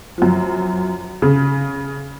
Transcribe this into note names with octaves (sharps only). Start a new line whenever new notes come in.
F#2 F3
C#3